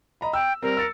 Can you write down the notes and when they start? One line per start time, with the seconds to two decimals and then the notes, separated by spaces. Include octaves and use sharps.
0.21 D#5 A#5 B5
0.34 G5 E6
0.63 G3 C4 A#4
0.77 E6 A6 C#7